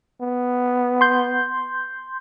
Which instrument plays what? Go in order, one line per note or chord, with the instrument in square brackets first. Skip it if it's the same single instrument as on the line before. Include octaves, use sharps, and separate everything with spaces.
[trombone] B3
[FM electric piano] C6 G6